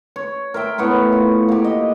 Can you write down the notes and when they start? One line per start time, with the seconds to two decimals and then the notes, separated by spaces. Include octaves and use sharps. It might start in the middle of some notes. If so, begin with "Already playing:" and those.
0.16 C#5
0.54 A#4 C5 E5 G5
0.78 A2 B3 C#5 C#6
1.12 F4
1.48 A#3 G4
1.64 D#5